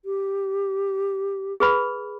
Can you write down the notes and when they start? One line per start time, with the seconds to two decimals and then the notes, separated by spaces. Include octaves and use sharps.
0.05 G4
1.60 G#4 B4 B5